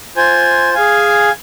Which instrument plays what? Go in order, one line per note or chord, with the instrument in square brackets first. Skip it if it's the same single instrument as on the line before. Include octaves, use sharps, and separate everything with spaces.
[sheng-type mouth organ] F4 C5 G#5
G#4 F5 G#5